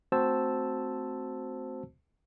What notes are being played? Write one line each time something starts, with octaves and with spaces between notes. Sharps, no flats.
A3 C4 F#4 C5 A5 E6